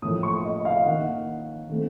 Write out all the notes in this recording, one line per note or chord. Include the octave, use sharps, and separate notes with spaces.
A2 F3 A#3 D#6
C#6
D#5
F5
D#3 A#3 F#5
D#3 A3 C4